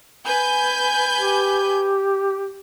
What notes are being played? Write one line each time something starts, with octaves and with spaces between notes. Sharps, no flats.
B4 G#5 G6
G4